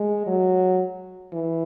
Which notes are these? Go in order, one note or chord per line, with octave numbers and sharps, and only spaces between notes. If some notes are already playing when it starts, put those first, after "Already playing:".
Already playing: G#3
F#3
E3